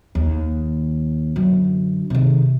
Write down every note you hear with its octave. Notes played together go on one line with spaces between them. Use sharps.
D#2
F#2 D3
C3 D#3